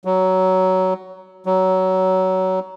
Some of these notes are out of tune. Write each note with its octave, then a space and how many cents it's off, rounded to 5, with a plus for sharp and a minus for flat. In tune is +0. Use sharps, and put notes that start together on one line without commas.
F#3 +15
F#3 +20